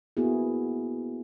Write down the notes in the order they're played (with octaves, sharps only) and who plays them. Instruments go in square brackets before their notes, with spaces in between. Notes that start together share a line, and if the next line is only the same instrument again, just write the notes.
[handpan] A#3 B3 E4 F#4 G#4